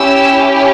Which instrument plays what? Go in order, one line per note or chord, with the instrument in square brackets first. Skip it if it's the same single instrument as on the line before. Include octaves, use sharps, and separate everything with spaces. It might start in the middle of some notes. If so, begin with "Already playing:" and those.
Already playing: [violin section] C#4 E4 G4 E6